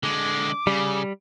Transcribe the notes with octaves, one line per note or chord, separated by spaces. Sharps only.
D3 G#3 D6
C#3 G3